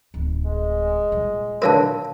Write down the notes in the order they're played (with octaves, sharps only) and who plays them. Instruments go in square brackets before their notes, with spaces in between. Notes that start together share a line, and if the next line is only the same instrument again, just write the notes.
[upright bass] D1 D#3
[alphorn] G#3
[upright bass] A#2 G3
[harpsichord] D3 F#3 B4 [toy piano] A#4 F5 A5